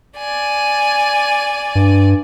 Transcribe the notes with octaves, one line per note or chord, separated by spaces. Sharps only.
D5 G#5
G2